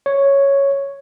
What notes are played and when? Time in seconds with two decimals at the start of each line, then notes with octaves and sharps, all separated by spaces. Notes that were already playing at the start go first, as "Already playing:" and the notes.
0.06 C#5